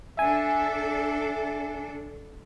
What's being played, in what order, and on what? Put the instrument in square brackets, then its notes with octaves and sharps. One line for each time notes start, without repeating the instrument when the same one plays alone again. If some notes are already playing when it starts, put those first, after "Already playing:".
[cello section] D4 A4 [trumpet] E5 [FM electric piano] G#5